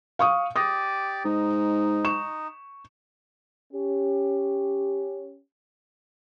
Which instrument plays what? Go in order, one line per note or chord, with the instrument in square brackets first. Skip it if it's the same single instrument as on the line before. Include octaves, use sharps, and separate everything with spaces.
[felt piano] F5 C#6 D#6
[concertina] G4 D5 [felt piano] D#6 A#6
[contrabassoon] G#2 [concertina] D#4
[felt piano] C#6 E7
[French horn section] C#4 G4